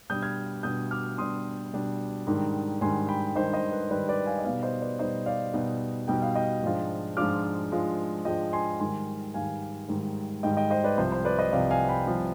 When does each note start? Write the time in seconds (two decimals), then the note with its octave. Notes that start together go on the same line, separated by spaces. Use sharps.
0.09 B2 G3 D4 D#6 G6
0.22 F6 G#6
0.63 B2 G3 D4 D#6 G6
0.91 D6 F6
1.18 B2 G3 D4 C6 D#6
1.73 B2 G3 D4
2.27 G#2 D#3 G3 D4
2.81 G#2 D#3 G3 D4 G#5 C6
3.09 G5 B5
3.36 G#2 D#3 G3 D4 C5 D#5
3.53 C5 D#5
3.72 B4
3.90 G#2 D#3 G3 D4 B4 D5
4.09 B4 D5
4.26 F5 G#5
4.39 D#5
4.44 B2 G3 B3 D#4 D5 F5
4.63 C5 D#5
4.81 B4 D5
4.99 B2 G3 B3 D#4 C5 D#5
5.26 D5 F5
5.54 B2 G3 B3 D#4
6.08 B2 G3 B3 D#4 G5
6.22 F5
6.35 D#5 G5
6.63 G#2 F3 G#3 D4 F4
7.17 G#2 F3 G#3 D4 F4 D6 F6
7.71 G#2 F3 G#3 D4 F4
8.25 G#2 F3 G#3 D4 F4 D#5 G5
8.53 G#5 C6
8.80 G#2 D#3 G3 G#5 C6
9.34 G#2 D#3 G3 F5 G#5
9.89 G#2 D#3 G3
10.43 G#2 D#3 G3 D#5 G5
10.57 D#5 G5
10.70 C5 D#5
10.84 B4 D5
10.98 C2 C3 F3 C5
11.12 C5
11.25 B4 D5
11.39 C5 D#5
11.52 C2 C3 F3 D5 F5
11.71 F5 G#5
11.89 G5 B5
12.07 C2 C3 F3